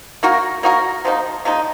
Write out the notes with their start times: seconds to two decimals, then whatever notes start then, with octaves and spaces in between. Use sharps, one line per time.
0.23 A#3 D#4 F#4 A#4
0.63 A#3 D#4 F#4 A#4
1.05 C3 F3 A#3 D#4
1.45 C3 F3 A#3 D#4